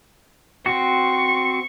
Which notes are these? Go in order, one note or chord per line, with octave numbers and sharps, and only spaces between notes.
C4 F#4 C#6